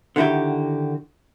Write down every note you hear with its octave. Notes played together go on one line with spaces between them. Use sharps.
D3 D#3 E4 F#4 G4